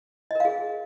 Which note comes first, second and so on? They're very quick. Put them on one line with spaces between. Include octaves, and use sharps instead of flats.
D#5 A#4 F5 G#4